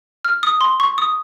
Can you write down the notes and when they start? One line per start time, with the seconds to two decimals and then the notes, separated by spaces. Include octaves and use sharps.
0.25 F6
0.43 D#6
0.61 C6
0.80 C#6
0.98 D#6